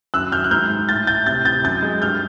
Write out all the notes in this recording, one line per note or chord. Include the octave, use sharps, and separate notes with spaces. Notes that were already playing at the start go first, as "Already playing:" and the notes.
F#2 E6 F#6
F#2 F6 G6
F#6
G#2 F6 G6
G#2
A2 G6 A6
A2 G6 A6
C3 G6 A6
C3 G6 A6
F#2 G6 A6
G#3
G2 F6 G6